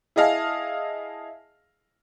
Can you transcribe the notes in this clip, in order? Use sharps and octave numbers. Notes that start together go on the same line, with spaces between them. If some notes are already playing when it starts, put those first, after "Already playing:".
E4 G#4 D#5 F5 A5